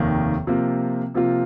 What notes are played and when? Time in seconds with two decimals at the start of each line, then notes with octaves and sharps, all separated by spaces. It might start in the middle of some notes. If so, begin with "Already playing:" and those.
Already playing: F1 D#2 D#3 A#3
0.47 C3 F3 A#3 F4
1.14 C3 F3 A#3 F4